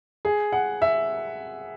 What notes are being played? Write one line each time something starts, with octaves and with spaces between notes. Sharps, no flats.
G#4
F#5
E5